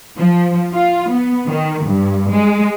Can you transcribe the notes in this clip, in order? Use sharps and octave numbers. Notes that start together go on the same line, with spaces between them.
F3
F4
B3
D#3
G2
G#3